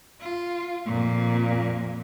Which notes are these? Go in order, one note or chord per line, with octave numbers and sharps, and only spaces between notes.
F4
F2 A#2